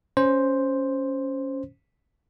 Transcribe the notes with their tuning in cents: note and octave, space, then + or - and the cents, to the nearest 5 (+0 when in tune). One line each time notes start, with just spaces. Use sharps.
C#4 +0 C5 +0